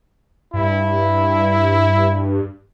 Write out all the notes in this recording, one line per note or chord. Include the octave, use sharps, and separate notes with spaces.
G2 E4